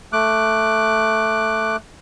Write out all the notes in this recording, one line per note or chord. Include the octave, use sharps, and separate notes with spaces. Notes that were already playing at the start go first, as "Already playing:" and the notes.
A3 D6 F#6